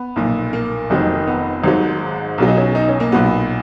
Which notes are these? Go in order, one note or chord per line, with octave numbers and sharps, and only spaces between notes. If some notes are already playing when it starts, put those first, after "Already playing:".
Already playing: B3
B1 A#2 F3
A#3
F1 F2 D#3 F#3
B3
G#1 G#2 F#3
B1 B2 F#3
D#4
C#4
D#4
C#4
A#3
B1 A#2 F#3 B3